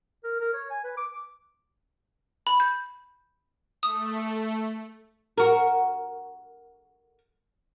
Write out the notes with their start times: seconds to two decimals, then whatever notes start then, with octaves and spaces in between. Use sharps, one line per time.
0.24 A#4
0.40 A#4
0.53 C#5
0.70 G#5
0.84 B4
0.97 D6
2.47 B5
2.60 G6
3.83 A3 D#6
5.38 F#4 A#4